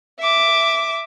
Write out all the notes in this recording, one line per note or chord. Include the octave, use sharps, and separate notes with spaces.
E5 D6